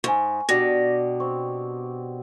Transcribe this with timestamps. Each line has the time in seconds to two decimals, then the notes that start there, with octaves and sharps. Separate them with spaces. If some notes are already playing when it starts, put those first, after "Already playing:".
0.04 G#2 G#5 C#6
0.49 B2 D4 G4 A#6
1.20 C4 C#6